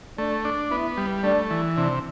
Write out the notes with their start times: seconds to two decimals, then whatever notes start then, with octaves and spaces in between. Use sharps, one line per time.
0.18 A3 D4
0.45 D4
0.71 B3 E4
0.97 G3
1.24 A3 D4
1.50 E3
1.77 C3 D4